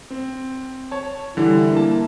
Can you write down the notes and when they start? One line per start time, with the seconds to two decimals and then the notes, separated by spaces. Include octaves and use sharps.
0.10 C4
0.91 C#5 A5
1.37 D3 E3 G3 E4
1.72 A#3 A5